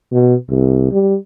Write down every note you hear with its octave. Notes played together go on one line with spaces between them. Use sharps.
B2
C2
G3